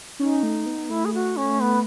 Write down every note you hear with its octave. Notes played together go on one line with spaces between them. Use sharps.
C#4 D#4
A3
B3
A3 E4
G#4
F#4
C#4
B3